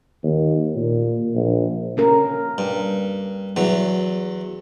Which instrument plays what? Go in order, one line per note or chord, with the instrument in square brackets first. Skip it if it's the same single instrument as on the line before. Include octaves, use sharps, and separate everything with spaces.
[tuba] D#2
A#2
A#1
[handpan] A#3 C#4 A#4
[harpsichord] G2
E2 F#3